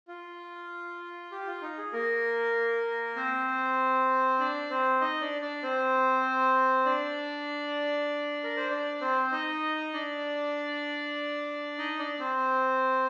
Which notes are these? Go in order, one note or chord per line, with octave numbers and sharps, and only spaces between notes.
F4
G4
F4
D#4
G#4
A#3 A#4
C4 C5
D4 D5
C4 C5
D#4 D#5
D4 D5
D4 D5
C4 C5
D4 D5
A#4
C5
D4 D5
C4 C5
D#4 D#5
D4 D5
D#4 D#5
D4 D5
C4 C5